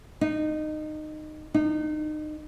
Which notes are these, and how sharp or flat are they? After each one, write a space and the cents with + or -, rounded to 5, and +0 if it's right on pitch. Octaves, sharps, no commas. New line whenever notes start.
D#4 -20
D#4 -30